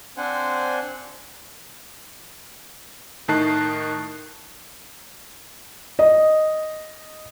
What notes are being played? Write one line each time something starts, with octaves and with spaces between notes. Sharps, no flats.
C4 D4 C5 F#5 G#5
A2 D#3 D#4 A5 F#6 C7
D#5